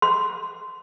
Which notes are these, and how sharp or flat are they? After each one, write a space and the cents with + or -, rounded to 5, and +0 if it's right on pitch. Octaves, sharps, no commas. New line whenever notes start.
C6 -15